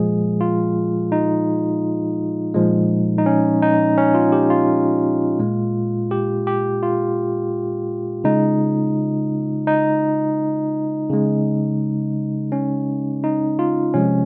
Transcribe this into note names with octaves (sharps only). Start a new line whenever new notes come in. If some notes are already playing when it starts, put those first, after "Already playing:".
Already playing: A#2 F3 G#3 G#4
F4
D#4
A#2 F3 G#3
D#4
C#4
D#4
C#4
F4
G4
F4
A#2 G#3
G4
G4
F4
C#3 G#3 D#4
D#4
C#3 G#3
C#4
D#4
F4
C3 F3 G#3 C#4